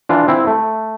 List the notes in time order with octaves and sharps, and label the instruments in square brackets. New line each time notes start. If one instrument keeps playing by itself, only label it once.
[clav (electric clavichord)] E3 D4 F4
C4 E4
A3